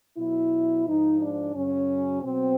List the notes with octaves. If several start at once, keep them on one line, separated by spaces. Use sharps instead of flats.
B2 F#3 E4
G#2 F3 D#4
D4
F#2 C#3 F#3 C#4
B2 F#3 C4